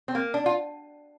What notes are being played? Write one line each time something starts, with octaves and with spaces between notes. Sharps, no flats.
C4
A#3
D4
F4